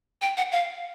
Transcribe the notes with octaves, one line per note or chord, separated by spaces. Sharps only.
G5
F#5
F5